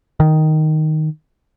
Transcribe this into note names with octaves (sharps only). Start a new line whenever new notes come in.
D#3